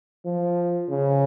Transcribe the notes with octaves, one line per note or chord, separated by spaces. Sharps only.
F3
C#3